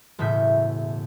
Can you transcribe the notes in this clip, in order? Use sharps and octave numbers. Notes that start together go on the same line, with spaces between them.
E1 A2 C#3 E5 G6